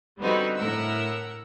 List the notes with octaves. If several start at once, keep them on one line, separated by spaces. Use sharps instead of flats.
D3 G3 B3 C4 D#4 F#4
A2 A#4 F#5 E6